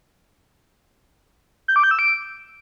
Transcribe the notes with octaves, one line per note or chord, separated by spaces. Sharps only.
G6
D6
G6
E6
D7